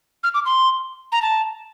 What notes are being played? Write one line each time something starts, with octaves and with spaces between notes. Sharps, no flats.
F6
D6
C6
A#5
A5